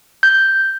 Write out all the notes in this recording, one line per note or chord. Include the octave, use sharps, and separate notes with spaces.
G6